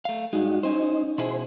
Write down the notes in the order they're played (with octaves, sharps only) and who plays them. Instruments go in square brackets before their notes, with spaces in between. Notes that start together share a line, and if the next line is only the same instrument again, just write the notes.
[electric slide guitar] A3 F5
[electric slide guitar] G2 G#3 [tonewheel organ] D#4 F#4
[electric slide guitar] C#4 C5 [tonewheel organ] D#4
[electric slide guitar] B2 E4 G#4 [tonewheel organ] C5